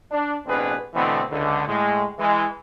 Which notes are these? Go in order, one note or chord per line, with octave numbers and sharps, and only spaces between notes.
D4
A1 B2 C4 D4 G#4 B4
B2 D3 E3 A3 B3 C4
C#2 D3
A2 G#3
E3 G#3